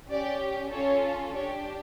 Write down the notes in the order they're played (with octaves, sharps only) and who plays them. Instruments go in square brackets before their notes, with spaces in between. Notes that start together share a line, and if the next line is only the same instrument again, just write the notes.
[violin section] C#4 G4 D5
C#4 F4 A4 C#5
D4 G4 C#5